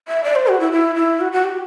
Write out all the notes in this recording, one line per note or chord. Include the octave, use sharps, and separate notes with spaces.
E5
D5
C5
F#4
E4
E4
E4
F#4
F#4
G4